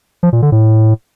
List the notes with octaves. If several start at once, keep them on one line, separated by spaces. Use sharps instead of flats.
F3
A#2
D3
A2